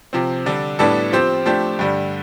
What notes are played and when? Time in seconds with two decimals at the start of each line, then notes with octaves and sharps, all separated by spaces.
0.13 C3 F3 C4
0.46 D3 G3 D4
0.79 A2 G3 B3 D4 A4
1.12 F3 C4 G4 C5
1.46 F3 A3 D4 G4 C5
1.79 G2 D3 G3